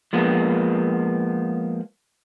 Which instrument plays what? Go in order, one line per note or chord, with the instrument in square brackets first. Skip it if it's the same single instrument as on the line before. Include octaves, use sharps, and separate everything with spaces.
[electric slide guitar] F3 G#3 A#3 B3